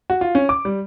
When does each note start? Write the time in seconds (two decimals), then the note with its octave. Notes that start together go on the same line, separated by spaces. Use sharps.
0.10 F#4
0.21 F4
0.35 C#4
0.49 D6
0.65 G3